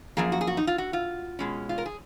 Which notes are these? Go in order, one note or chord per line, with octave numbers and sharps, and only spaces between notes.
F#2 F3 A#3 G#4
F#4
G#4
F#4
D#4
F4
F#4
F4
B2 G#3 C#4
F4
A#4
G#4